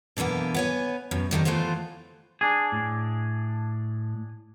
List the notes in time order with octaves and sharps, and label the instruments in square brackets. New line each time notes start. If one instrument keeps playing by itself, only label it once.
[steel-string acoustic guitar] B2 D3 E3 A#3 B3
B3 C#5 G#5
F#2 B2
A2 D3 D#3 G3
E3 A3 B3 F4 C5
[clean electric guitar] D4 G#4
[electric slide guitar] A2